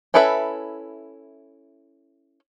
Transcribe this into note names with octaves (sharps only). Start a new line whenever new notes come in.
C#4 E4 A4 B4 E5